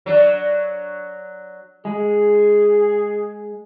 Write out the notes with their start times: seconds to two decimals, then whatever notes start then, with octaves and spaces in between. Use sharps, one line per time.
0.06 F#3 D4
1.85 G#3 G#4